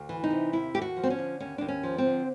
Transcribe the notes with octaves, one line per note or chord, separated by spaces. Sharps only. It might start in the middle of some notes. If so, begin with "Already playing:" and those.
Already playing: D2
E3
D#4
C3
D#2 E4
D#2 G4
F#4
F3
C4
C#4
D3
D#2 C#4
D#2 D4
C#4
F3
C4
D3